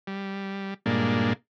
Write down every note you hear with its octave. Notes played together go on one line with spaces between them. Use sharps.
G3
G2 A#2 G#3 A#3 D4